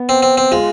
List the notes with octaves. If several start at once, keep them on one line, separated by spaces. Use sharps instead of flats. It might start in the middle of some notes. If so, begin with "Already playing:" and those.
Already playing: B3
C4
C4
C4
G#3 F4